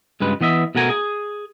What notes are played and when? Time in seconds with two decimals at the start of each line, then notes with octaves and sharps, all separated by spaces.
0.20 C#2 G2 G#3 B4
0.41 E3 B3 D#5 E5
0.75 B2 A3 F#4 A#4 G#5 A#5
0.89 G#4